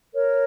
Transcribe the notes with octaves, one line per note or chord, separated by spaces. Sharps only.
A#4 C#5